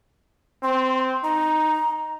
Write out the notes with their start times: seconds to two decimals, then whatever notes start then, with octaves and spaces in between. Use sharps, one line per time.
0.63 C4 C6
1.24 D#4 A#5